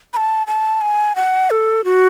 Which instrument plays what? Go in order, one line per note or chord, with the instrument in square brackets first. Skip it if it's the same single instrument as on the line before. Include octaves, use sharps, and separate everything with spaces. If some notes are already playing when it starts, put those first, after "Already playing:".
[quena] B5
A5
A5
G#5
F#5
A4
F#4